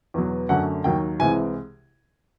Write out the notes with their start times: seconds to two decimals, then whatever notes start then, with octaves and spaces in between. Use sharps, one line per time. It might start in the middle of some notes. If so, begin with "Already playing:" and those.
0.14 E2 B2 F#3 B3
0.49 F#2 D3 F#3 A3 F#5
0.84 D#2 D#3 F#3 G5
1.19 C2 C3 E3 G#3 G#5